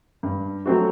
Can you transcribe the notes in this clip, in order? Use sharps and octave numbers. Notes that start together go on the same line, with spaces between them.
G2
F#3 A3 C4 F#4